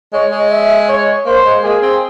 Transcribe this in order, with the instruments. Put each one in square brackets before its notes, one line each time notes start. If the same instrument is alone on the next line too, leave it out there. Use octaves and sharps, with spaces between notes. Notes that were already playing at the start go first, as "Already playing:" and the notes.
[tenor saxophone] G#3 [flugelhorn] C#5
[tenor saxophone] G#3
[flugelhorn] E5
C#5
[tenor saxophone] A#3 [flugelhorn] C5
[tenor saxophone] G#3
[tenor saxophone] A#3 [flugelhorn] G#4
[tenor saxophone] C4